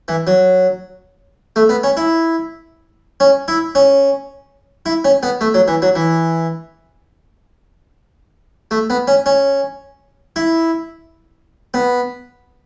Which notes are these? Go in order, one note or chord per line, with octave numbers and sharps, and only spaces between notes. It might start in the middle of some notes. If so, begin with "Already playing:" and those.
E3
F#3
A3
B3
C#4
E4
C#4
E4
C#4
E4
C#4
B3
A3
F#3
E3
F#3
E3
A3
B3
C#4
C#4
E4
B3